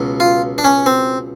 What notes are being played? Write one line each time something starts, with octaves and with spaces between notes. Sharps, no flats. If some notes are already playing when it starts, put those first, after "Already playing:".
Already playing: C#2 B2 F#3
F4
D4
C#4
C4